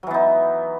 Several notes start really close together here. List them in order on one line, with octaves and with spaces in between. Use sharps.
F#3 E3 B3 D#4